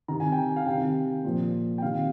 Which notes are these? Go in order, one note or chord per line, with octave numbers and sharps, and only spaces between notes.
C3 D#3 A#5
G#5
G5
G#5
F5
C3 D#3 G5
A#2 F3
G5
C3 D#3 F5